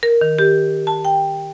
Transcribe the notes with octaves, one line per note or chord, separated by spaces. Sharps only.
A#4
D#3
G4
A5
G5